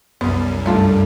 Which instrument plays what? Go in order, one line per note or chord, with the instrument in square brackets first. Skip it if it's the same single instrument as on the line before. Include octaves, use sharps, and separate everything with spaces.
[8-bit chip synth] C2 F#2 [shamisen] B3
[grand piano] G2 [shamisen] A3 F4 A4